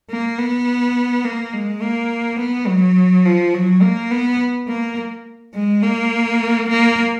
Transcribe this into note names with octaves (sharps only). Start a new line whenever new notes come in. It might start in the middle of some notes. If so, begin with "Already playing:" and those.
A#3
B3
A#3
G#3
A#3
B3
F#3
F3
F#3
A#3
B3
A#3
G#3
A#3
A#3